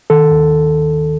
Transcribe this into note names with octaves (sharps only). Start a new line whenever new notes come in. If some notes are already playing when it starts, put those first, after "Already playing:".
D#3 A4
D#2